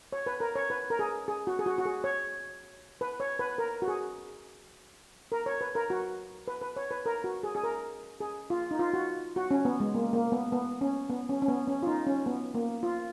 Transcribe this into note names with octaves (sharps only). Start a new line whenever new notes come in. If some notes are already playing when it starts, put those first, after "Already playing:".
C#5
B4
A#4
C#5
B4
A#4
G#4
G#4
F#4
G#4
F#4
F#4
G#4
C#5
B4
C#5
B4
A#4
F#4
G#4
A#4
C#5
B4
A#4
F#4
B4
B4
C#5
B4
A#4
F#4
G#4
G#4
A#4
G#4
F4
D#4
F4
F#4
F#4
C#4
B3
G#3
A#3
A#3
B3
B3
C#4
B3
C#4
C#4
B3
C#4
F4
D#4
C#4
B3
A#3
F4